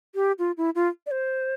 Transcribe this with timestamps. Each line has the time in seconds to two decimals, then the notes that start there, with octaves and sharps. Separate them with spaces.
0.15 G4
0.39 F4
0.57 E4
0.75 F4
1.06 D5
1.11 C5